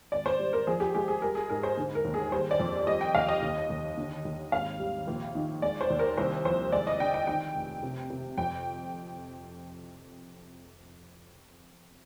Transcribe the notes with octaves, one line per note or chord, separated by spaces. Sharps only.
G#1 D5
C5
G3
A#4
F3 G#4
G4
G#3 G4
G#4
G3 A#4
G#4
G#2 A#4
C5
D3
A#4
D#2
G#4
G3 C5
D5
F2
G3 D#5
G5
D#2 F5
D#5
D#2
D#2
D3
D#2
G#1 F5
G3
A#1
D#3
G#3 D5
C5
D#2
A#4
C2 C5
F3 C5
G#3 D5
D#5
D3 G5
G5
D#3 G5
F1
C3
C3
F2 G5